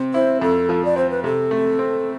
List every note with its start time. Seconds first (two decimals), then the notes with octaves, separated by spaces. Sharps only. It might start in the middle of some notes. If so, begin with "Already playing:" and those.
Already playing: C3 C4
0.14 E4 C5
0.42 F2 A4
0.69 F3
0.85 D5
0.96 C4 C5
1.10 B4
1.24 C3 A4
1.51 A3
1.79 C4